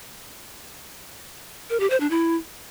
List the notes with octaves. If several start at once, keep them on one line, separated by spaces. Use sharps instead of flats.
A#4
G4
C5
D4
E4